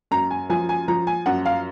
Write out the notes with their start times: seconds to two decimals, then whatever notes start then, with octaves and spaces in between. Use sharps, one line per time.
0.11 F#2 A#5
0.31 G#5
0.49 F3 G#5
0.69 G#5
0.88 F3 A#5
1.07 G#5
1.26 F#2 F#5
1.46 F5